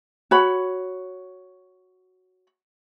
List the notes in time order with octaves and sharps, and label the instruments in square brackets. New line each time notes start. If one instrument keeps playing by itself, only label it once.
[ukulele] F#4 C#5 B5